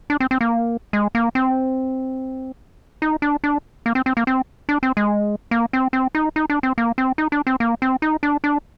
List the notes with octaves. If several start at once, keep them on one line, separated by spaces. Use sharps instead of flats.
D4
C4
C4
A#3
G#3
A#3
C4
D#4
D4
D4
A#3
C4
C4
A#3
C4
D4
C4
G#3
A#3
C4
C4
D#4
D#4
D4
C4
A#3
C4
D#4
D4
C4
A#3
C4
D#4
D4
D4